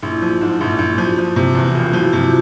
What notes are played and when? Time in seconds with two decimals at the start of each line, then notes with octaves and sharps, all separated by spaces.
0.03 A#1 E4
0.22 F3
0.41 G#2
0.60 A#1 E4
0.78 A#1 E4
0.98 F3 E4 F#4
1.18 F3
1.36 C3
1.55 E2
1.75 E1 F4
1.93 F3 E4 F#4
2.13 C3 F4 G4